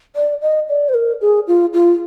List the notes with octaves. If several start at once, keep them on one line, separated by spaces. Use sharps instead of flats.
D5
D#5
D5
C5
A#4
G#4
F4
F4